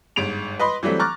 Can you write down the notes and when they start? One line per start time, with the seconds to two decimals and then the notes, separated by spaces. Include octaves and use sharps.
0.16 G1 G#2 D7 F7
0.59 B4 D#5 B5 C6
0.83 E3 F#3 G3 A3 C4
0.99 A#5 C#6 D6 F6 F#6 A6